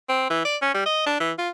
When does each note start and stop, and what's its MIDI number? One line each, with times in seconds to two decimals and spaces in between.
0.09 0.27 60
0.30 0.42 52
0.45 0.56 74
0.62 0.71 61
0.74 0.85 55
0.85 1.03 75
1.06 1.15 62
1.20 1.32 52
1.38 1.49 65